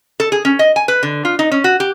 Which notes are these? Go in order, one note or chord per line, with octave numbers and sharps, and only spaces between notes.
A4
G#4
C#4
D#5
G#5
B4
D3
F4
D#4
C#4
F#4
G4